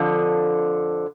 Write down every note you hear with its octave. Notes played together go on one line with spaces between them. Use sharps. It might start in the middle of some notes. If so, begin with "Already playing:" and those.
Already playing: F2 D3 F3